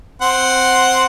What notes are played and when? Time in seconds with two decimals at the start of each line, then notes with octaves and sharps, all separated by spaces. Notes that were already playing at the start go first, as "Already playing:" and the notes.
0.22 C4 F#5 C6